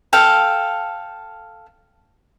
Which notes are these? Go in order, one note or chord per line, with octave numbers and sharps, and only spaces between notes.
A4 F5 G5